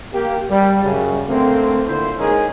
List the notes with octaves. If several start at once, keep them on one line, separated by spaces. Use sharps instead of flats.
A#3 G4
G3
F#2 C#3
D3 A3 A#3 C4
A#2 D3 E4 C5
G#3 A#3 C#4 D#4 G#4 A#4